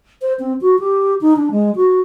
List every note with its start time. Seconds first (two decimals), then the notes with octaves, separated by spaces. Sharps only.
0.22 C5
0.39 C4
0.61 F#4
0.79 G4
1.21 D#4
1.37 D4
1.51 G#3
1.76 F#4